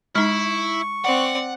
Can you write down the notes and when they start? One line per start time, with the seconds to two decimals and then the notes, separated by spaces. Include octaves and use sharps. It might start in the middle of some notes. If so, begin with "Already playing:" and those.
0.15 G#3 D#4 E4 C#6
1.05 C4 D5 F#5